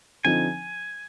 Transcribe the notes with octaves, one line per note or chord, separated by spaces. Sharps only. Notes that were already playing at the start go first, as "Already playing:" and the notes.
D3 F3 C4 D#4 G#5